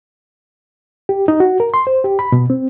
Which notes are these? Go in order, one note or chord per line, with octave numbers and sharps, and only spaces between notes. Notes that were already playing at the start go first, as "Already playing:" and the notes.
G4
D#4
F#4
A#4
C6
C5
G4
B5
B2
C4